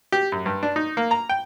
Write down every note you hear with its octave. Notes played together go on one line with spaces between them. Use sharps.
G4
F#2
G2
D4
D#4
A#3
A#5
G5